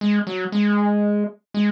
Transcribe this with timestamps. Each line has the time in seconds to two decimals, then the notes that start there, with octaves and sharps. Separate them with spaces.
0.01 G#3
0.27 F#3
0.52 G#3
1.54 G#3